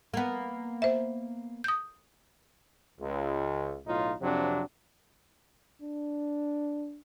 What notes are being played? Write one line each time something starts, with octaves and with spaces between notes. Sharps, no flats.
A#3 B3
C5 E5
D#6 G6
C#2
B1 A2 D#4 F4
F2 C3 F#3 C4 D4
D4